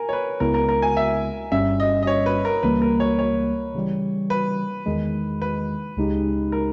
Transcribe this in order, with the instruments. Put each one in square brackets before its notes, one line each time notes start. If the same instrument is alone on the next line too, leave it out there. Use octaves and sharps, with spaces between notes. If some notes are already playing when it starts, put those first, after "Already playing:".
Already playing: [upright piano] A#4 G#5
C#5
B4
[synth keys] C#2 C#3 G#3 B3 E4 [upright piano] A#4
[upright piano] A#4
A#4
G#5
E5
[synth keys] G1 G2 G3 C#4 [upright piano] E5
[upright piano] D#5
D#5
C#5
B4
A#4
[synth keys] C#2 C#3 E3 G3 A#3 [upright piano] B4
[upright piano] A#4
C#5
C#5
[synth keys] C#3 E3 G3
[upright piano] B4
[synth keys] E2 D#3 G#3
[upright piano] B4
[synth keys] C#2 C#3 G#3 D#4 G4
[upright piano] A#4